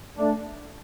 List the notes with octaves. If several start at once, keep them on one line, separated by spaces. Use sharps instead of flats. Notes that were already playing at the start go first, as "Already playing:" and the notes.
A3 D4